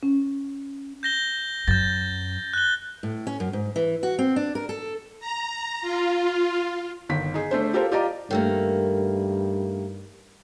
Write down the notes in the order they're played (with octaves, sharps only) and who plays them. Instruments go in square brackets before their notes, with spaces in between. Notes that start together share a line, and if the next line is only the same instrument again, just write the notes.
[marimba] C#4
[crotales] G6 A#6 G7
[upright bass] F#2 [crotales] G6 A6
[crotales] F#6 G7
[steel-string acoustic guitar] A2
C#4
F#2
G#2
E3
F#4
C4
D4
A#4
A4
[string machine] A#5
F4
[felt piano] G1 D#3 B6
D#4 G#4
A3 D4 C5
F4 G4 A4 A#4 C5
F4 G4 D5 D#5 A#5 D6
[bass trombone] G2 [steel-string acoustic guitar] D#3 A3 A#3